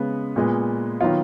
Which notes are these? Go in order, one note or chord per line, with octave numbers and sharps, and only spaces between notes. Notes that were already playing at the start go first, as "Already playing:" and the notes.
Already playing: C#3 G#3 B3
A#2 G#3 B3
D#3 F#3 B3 F4